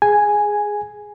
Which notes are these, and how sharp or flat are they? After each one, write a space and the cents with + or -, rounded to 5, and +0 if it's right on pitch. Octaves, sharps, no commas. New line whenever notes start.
G#4 +0 G#5 +0